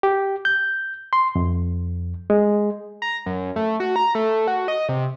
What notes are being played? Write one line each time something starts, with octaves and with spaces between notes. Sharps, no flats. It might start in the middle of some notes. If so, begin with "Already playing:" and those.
G4
G6
C6
F2
G#3
A#5
F#2
A3
F#4
A#5
A3
F#4
D#5
C3